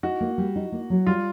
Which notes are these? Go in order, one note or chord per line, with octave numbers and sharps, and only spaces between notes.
D#4 F#4
A#3
G3
D#4
A#3
F#3
G3 F4